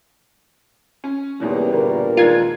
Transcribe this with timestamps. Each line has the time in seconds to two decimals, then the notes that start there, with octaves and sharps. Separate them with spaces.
1.04 C#4
1.40 E2 G#2 B2 E3 G3 A#3 C#4
1.72 G1 A#2 D4 A#4
2.17 D#2 G#3 F4 G#6 A6